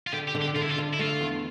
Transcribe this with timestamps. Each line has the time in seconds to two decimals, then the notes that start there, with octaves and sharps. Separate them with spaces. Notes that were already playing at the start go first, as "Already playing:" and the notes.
0.07 F4
0.12 D3 G4
0.28 G4
0.35 D3
0.42 G4
0.56 D3 F4
0.63 E4
0.70 F4
0.78 D3
0.94 E4
0.99 A3 F4
1.21 E2